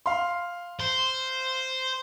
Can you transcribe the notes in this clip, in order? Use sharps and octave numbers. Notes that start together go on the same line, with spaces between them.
F5 C6
C5